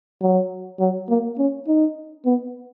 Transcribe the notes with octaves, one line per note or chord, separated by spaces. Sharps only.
F#3
F#3
A#3
C#4
D#4
B3